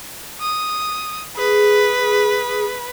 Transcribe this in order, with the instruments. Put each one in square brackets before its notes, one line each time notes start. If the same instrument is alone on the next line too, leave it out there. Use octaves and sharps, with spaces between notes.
[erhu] D#6
[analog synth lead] G#4 [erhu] B4